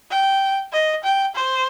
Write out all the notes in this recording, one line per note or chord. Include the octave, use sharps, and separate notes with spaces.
G5
D#5
G5
C5